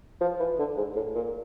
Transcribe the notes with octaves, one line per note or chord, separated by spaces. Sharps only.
F3
E3
D3
G#2
A2
A#2